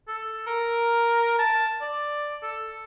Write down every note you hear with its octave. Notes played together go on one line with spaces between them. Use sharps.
A4
A#4
A5
D5
A4